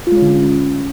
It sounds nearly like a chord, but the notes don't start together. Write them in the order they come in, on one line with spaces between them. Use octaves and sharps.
F4 G#3 C#4 D3